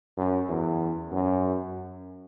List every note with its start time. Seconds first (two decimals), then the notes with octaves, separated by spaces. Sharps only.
0.17 F#2
0.48 E2
1.12 F#2